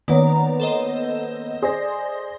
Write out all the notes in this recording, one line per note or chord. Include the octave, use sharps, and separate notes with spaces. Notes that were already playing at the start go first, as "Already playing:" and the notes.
D#3 A#3 B3 C#4 D5 A#5
A4 C5 D#5
G#4 C5 D5 C6 A#6